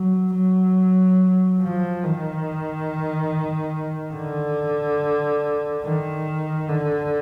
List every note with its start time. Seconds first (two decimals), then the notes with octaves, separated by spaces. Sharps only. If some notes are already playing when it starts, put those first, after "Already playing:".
Already playing: F#3
0.34 F#3
1.61 F3
2.04 D#3
4.15 D3
5.84 D#3
6.69 D3